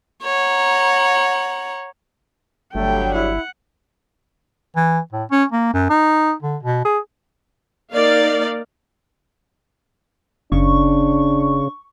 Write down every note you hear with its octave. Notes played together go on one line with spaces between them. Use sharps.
C#5 F#5 A#5
G1 D3 F#3 G3 A3 G5
E4 F#5
E3
A2
C#4
A#3
F#2
D#4
D3
B2
G#4
A#3 D#4 A#4 D5 F5
F#1 C#3 D4 C#6